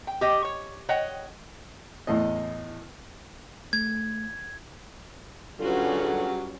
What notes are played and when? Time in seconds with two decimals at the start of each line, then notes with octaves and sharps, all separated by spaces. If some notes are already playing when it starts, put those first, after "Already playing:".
0.07 G5
0.21 G4 D#5 G5
0.45 C#5
0.89 C#5 D#5 F#5 G5
2.07 E2 A2 D#5
3.73 A3 G#6
5.60 D3 F#3 G3 C#4 F4 F#4 G#4 B4